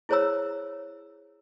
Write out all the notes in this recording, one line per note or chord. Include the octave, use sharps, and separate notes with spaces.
E4 G#4 C5 C#5 A#5 E6